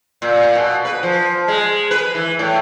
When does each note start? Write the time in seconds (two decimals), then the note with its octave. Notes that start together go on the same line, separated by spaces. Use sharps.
0.22 A#2
0.55 B2
0.85 B4
1.03 F3
1.48 G#3
1.91 B4
2.15 E3
2.39 A2